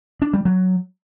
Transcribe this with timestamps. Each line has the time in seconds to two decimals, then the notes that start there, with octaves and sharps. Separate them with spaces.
0.22 D4
0.34 G3
0.45 F#3